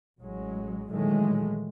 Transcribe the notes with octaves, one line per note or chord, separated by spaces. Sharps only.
A1 F#3 G#3
A#2 D#3 E3 F#3 G#3 A3